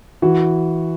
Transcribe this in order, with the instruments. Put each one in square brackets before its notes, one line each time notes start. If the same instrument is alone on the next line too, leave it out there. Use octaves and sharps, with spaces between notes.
[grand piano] E3 [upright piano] F#4